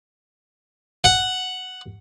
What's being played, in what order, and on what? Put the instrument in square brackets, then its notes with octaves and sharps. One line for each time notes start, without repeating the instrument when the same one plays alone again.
[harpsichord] F#5